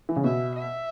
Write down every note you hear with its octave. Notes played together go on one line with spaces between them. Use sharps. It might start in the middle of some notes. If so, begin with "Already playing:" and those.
E3
C#3
B2 E5
E5